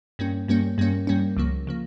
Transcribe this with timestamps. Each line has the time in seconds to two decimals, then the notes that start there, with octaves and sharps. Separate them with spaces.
0.19 G2 G3 A#3 C#4
0.48 G2 G3 A#3 C#4
0.78 G2 G3 A#3 C#4
1.07 G2 G3 A#3 C#4
1.37 C#2 C#3 F3 A#3
1.67 C#3 F3 A#3